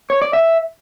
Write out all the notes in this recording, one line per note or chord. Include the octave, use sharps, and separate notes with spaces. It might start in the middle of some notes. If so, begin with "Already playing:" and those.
C#5
D5
E5